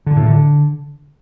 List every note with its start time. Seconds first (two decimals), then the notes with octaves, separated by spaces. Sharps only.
0.06 D3
0.16 A2
0.26 D3